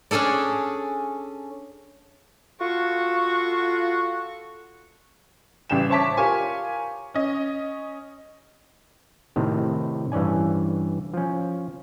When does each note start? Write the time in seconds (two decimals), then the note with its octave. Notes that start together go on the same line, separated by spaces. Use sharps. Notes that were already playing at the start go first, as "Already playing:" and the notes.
0.11 C#4 D4 G#4 A4 D5
2.61 F4 F#4 A4 C#6
5.70 A1 C#3 G3 G5 E7
5.90 C5 C#5 E5 A5 D6 B6
6.17 F4 G4 A#4 C#5 G#5 C#6
7.14 C#4 D#5
9.36 A2 C3 D#3
10.12 G2 E3 C#4 D5 G#5
11.14 F3 C#4